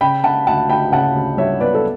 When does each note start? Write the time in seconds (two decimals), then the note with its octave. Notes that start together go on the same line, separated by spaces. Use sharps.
0.01 C#3 G5 B5
0.24 C#3 F#5 A5
0.47 D2 F#5 A5
0.70 D2 G5 B5
0.92 C#3 F#5 A5
1.15 D2
1.37 G3 C#5 E5
1.60 B3 B4 D5
1.74 A4